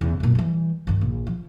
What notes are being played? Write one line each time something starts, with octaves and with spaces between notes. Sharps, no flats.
E2 C#3
F#2 A#2
E3 G3
G2 D#3
A#1
F3